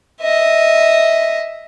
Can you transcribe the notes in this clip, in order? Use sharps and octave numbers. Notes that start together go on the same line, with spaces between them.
D#5 E5